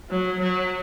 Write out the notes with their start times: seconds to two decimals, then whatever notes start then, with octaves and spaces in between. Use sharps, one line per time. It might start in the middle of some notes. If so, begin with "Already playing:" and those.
0.10 F#3
0.40 F#3